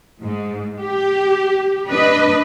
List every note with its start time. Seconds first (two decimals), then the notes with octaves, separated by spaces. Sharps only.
0.23 G#2
0.80 G4
1.89 D4 B4 D#5